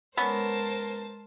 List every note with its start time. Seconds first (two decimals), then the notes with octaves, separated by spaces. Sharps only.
0.17 G#3 B3 C#4 A#4 C5 A5